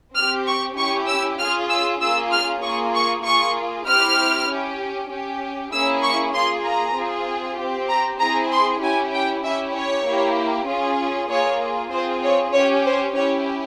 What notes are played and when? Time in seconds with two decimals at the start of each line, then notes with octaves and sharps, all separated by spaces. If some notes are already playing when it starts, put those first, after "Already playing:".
0.15 C4 G4 F6
0.47 C#6
0.77 C#4 E4 G4 C#6
1.07 E6
1.39 C#4 F4 G#4 F6
1.70 E6
2.01 A#3 C#4 F4 G#4 E6
2.32 F6
2.63 A#3 F4 G#4 C#6
2.94 C#6
3.24 A#3 F4 G#4 C#6
3.87 C4 E4 G4 F6
4.49 C#4 G4
5.11 C#4 G4
5.72 A#3 C#4 E4 G#4 E6
6.03 C#6
6.34 A#3 F4 G#4 C6
6.65 A#5
6.96 C4 F4 G#4
7.58 C4 G4
7.89 A#5
8.20 C4 E4 G#4 A#5
8.51 C6
8.82 C#4 E4 G4 G#5
9.13 G5
9.44 C#4 E4 G4 E5
9.75 C#5
10.06 A#3 E4 G4
10.67 C#4 F4 G#4
11.30 A#3 F4 G#4 C#5
11.92 C4 F4 G#4 C5
12.23 C#5
12.53 C#4 G4 C#5
12.85 C5
13.15 C#4 E4 G4 C#5